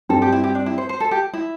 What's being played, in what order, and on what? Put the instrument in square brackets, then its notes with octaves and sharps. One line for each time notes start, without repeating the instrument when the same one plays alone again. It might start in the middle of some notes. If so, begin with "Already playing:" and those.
[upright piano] G2 G3 C4 [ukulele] A4
[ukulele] G4
E4
G4
D4
E4
C5
C5
A4
G4
E4